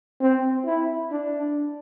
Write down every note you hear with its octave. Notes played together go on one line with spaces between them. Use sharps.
C4
E4
D4